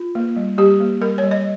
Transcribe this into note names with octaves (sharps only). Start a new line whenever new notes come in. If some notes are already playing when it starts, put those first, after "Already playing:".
Already playing: F4
A#3
G3
G3 G4
A#3
G3 A#4
G3 C#5
D#5